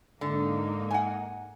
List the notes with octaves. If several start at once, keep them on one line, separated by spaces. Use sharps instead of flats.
G#2 D3 A#3 D#4
F#5 G#5